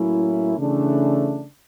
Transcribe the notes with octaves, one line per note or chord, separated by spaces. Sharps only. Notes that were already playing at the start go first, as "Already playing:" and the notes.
Already playing: A2 F#3 A#3 C#4 E4
C#3 E3 A3 D4